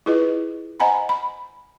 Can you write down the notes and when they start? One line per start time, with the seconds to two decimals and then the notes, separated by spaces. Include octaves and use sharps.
0.06 E4 F4 G#4 B4 D#5
0.80 C5 D#5 F#5 G#5 A#5 B5
1.09 B5